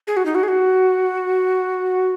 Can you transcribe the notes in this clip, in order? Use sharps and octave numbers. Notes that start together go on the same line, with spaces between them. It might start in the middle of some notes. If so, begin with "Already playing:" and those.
G#4
F#4
D#4
F#4
G#4
F#4